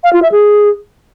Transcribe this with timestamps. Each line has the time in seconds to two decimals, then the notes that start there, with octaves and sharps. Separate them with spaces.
0.04 F5
0.13 F4
0.22 E5
0.32 G#4